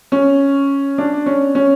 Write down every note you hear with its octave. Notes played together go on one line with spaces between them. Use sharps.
C#4
D4
C#4
C#4